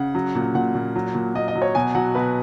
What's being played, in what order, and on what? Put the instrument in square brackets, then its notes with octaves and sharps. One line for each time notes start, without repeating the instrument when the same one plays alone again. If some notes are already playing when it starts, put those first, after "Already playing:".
Already playing: [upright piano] C#3 F#5
F#3
A#2
A#2 F#5
A#2
F#3
A#2
A#2 D#5
D#5
F#3
C#5
B2 G#5
F#3 F#5
B2 B4